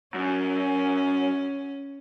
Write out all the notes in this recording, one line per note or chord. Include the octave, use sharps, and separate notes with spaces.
F#2 C#4